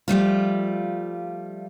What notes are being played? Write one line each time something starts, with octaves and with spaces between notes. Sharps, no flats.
F3 G3 A3 F4